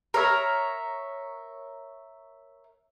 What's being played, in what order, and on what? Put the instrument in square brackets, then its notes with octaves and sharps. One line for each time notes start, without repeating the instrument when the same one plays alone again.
[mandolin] A#4 C#5 E5